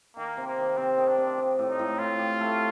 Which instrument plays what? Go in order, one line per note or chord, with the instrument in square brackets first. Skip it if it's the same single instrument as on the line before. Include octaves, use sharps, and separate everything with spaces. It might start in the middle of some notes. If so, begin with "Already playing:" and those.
[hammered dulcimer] D#3 [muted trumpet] A#3
[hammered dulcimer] C3
[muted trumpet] A#3
[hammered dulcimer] D#3
[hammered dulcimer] C3 [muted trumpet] C4
[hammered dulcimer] D#3
[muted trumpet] D4
[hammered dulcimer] C3
G4
A2
[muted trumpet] D#4
[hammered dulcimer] A2
[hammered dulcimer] A2 [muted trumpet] F4
[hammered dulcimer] G4
A3